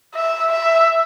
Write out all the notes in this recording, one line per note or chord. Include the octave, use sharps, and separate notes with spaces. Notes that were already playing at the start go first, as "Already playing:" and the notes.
E5
E5